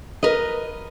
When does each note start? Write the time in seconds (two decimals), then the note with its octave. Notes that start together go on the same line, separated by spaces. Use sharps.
0.23 A#4 B4 D#5